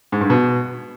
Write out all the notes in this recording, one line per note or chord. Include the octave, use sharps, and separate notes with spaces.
G#2
G2
B2